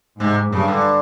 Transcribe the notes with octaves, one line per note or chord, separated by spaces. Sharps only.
G#2 C3
G2 C#3
D3